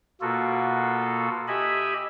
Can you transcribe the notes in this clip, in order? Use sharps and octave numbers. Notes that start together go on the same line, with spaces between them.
B2 A#3 F4 F#4 A4
G4 D#5 E5 G#5 B5